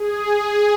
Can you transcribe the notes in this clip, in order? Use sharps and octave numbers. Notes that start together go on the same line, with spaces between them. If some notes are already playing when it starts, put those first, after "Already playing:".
Already playing: G#4
G#4